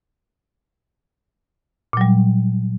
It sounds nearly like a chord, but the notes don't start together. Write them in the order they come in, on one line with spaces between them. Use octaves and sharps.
A#2 F#3 G3